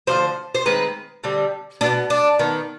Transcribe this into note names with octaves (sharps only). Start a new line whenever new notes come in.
D3 F3 C4 C5
C5
D#3 G#3 C4 B4
D3 G3 C4
B2 B3 D4
D4
D#3 B3